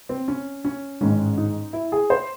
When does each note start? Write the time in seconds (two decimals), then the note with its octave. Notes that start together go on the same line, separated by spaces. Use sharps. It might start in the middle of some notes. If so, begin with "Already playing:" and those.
0.09 C4
0.28 C#4
0.65 C#4
1.01 A1 G#2 D#3 G#3 C#4
1.37 D#4
1.73 E4
1.92 G#4
2.10 C5